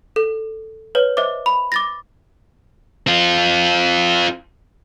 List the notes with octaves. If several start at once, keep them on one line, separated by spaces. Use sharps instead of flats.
A4
B4 C#5
C5 D#5 E5 D6
B5
D6 A6 A#6
C4 F4